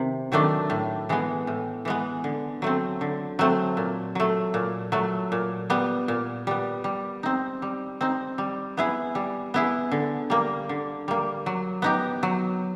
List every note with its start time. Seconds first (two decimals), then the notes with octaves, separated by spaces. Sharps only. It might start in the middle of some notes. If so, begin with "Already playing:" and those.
Already playing: C3 D#3
0.32 D#3 F#3 A3 D4
0.70 A2
1.09 E3 G#3 B3
1.47 A2
1.85 E3 G#3 B3
2.24 D3
2.62 F#3 A3 C4
3.01 D3
3.39 F#3 A3 C4
3.77 A#2
4.15 F#3 A3
4.54 A#2
4.92 F#3 A3
5.32 A#2
5.70 G3 B3
6.08 A#2
6.47 G3 B3
6.84 G3
7.23 C4 D#4
7.62 G3
8.01 C4 D#4
8.38 G3
8.77 B3 E4 G#4
9.15 G3
9.54 B3 E4 G#4
9.92 D3
10.30 G3 A#3
10.69 D3
11.08 G3 A#3
11.46 F#3
11.82 B3 D#4 G4
12.23 F#3